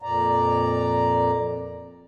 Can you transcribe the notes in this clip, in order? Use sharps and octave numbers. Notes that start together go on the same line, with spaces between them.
F2 A#2 D5 A#5